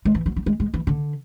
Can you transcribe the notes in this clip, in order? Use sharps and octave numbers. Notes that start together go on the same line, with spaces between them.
G#3
E3
F#3
F#3
G#3
G#3
E3
D3